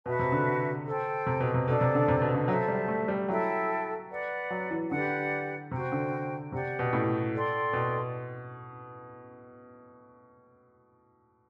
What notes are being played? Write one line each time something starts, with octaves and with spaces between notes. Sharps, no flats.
B2 F#4 B4 E5 A5
C3
D3
A4 C5 G5
C3
B2
C3
B2 D4 A4 D5
C3
D3
C3
B2
D3
F#3 A4 C5 E5 A5
G3
A3
G3
F#3 E4 A4 E5 G5
B4 D5 F#5
F#3
E3
D3 G4 B4 D5 F#5
C3 F#4 C5 G5
D3
C3 G4 D5 F#5
B2
A2
A4 D5 G5 C6
B2